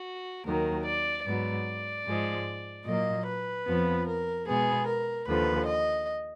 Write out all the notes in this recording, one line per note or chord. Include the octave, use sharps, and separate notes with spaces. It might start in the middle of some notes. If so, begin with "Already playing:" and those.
Already playing: F#4
D#2 D#3 F#3 A#4
D5
G#2 F#3 B3 D5
G#2 F3 G#3
A#2 F#3 A#3 D#5
B4
F2 F3 B3
A#4
B2 G#3 B3 G#4
A#4
D#2 D3 F3 B4
D#5